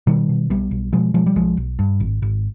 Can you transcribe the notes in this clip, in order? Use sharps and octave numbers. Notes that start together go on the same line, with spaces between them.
B2 D#3 G3
B2
B1 G3 B3
B1
B2 F3 G#3
B2 F3 G#3
G3
B1 F3 G#3
B1
G2
G#1
G#1